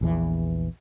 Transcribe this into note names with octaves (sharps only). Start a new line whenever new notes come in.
A#1 E2 E3